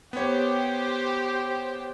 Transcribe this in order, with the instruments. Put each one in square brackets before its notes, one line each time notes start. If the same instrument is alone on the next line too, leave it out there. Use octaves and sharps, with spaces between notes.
[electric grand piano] B3 C#5 [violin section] G4 C5